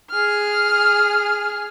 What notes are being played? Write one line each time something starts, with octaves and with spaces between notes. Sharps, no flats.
G#4 F6